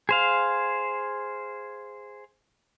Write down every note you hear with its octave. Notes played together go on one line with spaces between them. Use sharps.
G#4 C5 F5